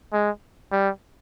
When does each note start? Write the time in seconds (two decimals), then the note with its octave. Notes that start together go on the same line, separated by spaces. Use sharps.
0.13 G#3
0.72 G3